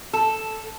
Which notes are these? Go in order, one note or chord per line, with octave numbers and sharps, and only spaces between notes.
A4